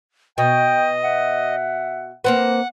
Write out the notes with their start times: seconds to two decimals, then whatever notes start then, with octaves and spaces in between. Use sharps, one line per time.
0.38 B2 D#5 G5
1.04 E5 F#5
2.24 A#3 C4 B4 F#5